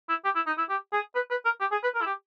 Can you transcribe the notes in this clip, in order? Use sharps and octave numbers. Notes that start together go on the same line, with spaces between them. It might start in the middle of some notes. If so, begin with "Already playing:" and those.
E4
G4
E4
D#4
E4
G4
G#4
B4
B4
A#4
G4
G#4
B4
A#4
E4
G4